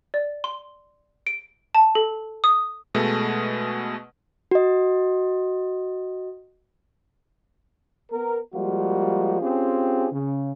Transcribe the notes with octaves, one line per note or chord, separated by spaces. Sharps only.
D5
C6
D7
A5
A4
D#6
B2 G#3 A3
F#4 D#5
B3 A#4
F3 G3 G#3 A#3 F4 F#4
C4 C#4 F4 G4 G#4
C#3